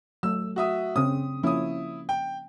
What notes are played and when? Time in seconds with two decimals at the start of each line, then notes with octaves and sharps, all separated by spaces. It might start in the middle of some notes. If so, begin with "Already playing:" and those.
0.23 F#3 A3 E6
0.56 F#4 E5 D#6
0.96 C#3 C4 C#4 D#6
1.43 F3 A#3 C#4 E4 D#6
2.09 G5